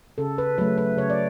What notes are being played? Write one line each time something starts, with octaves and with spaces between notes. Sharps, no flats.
C#3 A4
B4
F#3 A3 B4
B4
C#3 C#5
D5